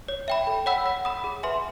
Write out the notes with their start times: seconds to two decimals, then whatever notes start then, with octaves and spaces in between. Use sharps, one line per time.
0.08 C#5
0.28 E5 G5 B5
0.47 A4
0.66 C#5 F#5 B5 E6
0.86 F#5
1.05 B5 D#6
1.24 G#4
1.43 B4 E5 G#5 C6